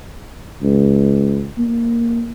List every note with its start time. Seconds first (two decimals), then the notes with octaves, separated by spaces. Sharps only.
0.62 C#2
1.58 A#3